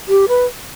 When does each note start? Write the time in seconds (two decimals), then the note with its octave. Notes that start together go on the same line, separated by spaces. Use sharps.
0.08 G4
0.28 B4